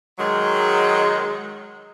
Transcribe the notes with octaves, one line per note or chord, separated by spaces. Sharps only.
D#3 F#3 G#3